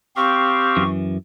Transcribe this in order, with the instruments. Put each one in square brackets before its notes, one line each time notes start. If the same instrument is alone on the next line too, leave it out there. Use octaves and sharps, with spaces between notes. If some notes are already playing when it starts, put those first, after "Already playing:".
[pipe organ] C4 G4 F5 [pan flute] C#6
[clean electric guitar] F#2 E3